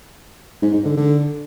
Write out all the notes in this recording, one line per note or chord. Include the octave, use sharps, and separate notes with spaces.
G#2
G#2
D3
D3